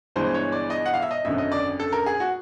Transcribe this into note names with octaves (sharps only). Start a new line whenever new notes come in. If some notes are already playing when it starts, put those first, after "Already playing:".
G1 G2 E3 G#3 C5
C#5
D5
D#5
F#5
F5
E5
D#5
G#1 F#2 D3 E5
D#5
D5
A4
A#4
G#4
F#4